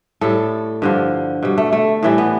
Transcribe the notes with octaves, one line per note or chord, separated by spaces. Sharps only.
A2 G3 A4
G2 D3 F3
B2 G3
A3
A3
A2 E3 G3
B3